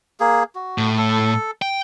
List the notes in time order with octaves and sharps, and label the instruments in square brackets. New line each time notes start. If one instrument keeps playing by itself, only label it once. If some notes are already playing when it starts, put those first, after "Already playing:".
[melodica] A#3 G#4
F#4
[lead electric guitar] A2
[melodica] A4
[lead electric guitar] G5